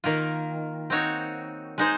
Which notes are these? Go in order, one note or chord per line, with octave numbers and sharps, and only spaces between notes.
D#3 A#3 F4
C4 D#4 F#4 C#5
G#3 D#4 G#4 C5